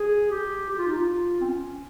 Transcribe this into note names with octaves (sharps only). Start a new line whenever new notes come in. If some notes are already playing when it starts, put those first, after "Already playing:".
Already playing: G#4
G4
G4
F4
D#4
F4
C4
C#4